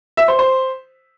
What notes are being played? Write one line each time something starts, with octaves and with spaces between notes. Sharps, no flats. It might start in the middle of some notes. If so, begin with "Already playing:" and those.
E5
C5
C5